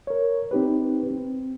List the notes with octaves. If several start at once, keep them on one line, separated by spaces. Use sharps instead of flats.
A#4 C#5
C4 D#4 G4 B4
C4